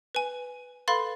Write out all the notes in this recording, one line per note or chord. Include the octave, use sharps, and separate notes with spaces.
B4 G#5
A4 B4 F5 B5 C6 A6